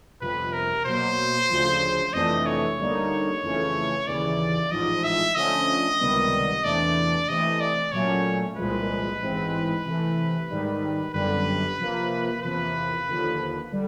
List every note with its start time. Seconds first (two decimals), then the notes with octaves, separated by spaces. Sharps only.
0.21 G1 F2 C3 F3 B4
0.52 A#4
0.85 B2 F#3 A#3 C5
1.50 D2 C#3 F3
2.13 F2 C3 E3 A3 D4 D#5
2.46 C#5
2.78 D2 D3 G3 A#3 D#4
3.42 F2 C#3 E3 A3 C#4
4.07 D#2 C#3 E3 D5
4.71 A1 G#2 F3 D#5
5.04 E5
5.35 D3 F3 A3 C#4 D#5
5.99 C#2 C3 D#3 G3 B3
6.64 E2 C3 E3 A3 D4 D5
7.28 C3 E3 A3 D#5
7.60 D5
7.92 A#2 F#3 A3 C#4 C#5
8.57 C2 A#2 F3 G#3 B4
9.21 A1 G#2 E3 G#3 C4
9.85 C3 E3 A3
10.50 G#2 D#3 G3
11.14 G1 F#2 D3 G3 B4
11.78 C3 F3 A#3
12.43 E2 C3 F3 A#3 B4
13.07 D#2 D3 F3
13.72 D3 G3